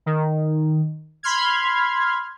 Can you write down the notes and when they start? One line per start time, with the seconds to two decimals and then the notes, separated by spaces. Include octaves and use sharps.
0.06 D#3
1.23 B5 C6 F6 G#6